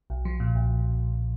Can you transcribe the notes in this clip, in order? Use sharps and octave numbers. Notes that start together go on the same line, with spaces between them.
B1
F3
A#2
B1